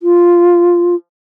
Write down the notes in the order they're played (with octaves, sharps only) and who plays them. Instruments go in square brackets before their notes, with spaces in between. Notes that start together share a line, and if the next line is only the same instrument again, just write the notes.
[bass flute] F4